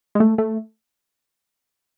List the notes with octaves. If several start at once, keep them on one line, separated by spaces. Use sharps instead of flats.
G#3
A3
A3